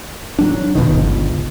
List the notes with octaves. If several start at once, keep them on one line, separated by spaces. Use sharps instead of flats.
F#3 D4
F2 B2 D#3
G1 C#2